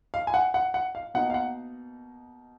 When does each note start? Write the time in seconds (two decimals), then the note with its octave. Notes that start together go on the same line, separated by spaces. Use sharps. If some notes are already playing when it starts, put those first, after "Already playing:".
0.14 F5
0.27 G#5
0.34 F#5
0.54 F#5
0.74 F#5
0.95 F5
1.14 B2 A#3 D#4 F#5
1.30 F5
1.34 F#5